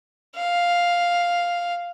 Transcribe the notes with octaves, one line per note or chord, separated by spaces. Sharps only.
F5